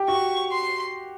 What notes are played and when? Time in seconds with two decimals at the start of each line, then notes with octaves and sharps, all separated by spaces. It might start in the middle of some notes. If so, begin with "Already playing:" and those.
Already playing: G4
0.08 F#4 C#6
0.52 C6